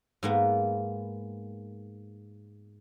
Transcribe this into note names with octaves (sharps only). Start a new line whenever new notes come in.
G#2 A#3 B3